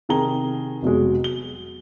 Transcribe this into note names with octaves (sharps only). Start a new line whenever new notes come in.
C3 D#3 G#4 A#5 G7
F1 B2 F#3 G#3
G7